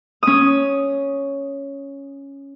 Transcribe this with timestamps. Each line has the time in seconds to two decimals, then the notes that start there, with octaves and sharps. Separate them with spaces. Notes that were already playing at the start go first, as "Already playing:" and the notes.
0.23 C#4 D#6